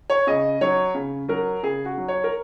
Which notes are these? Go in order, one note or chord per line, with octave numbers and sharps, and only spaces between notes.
C#5
C#3 D#5
F#3 C#5
C#3
F#3 A#4
C#3 G#4
F#4
F#3
C#5
A#4